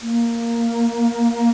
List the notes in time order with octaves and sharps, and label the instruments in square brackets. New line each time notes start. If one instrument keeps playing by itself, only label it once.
[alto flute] A#3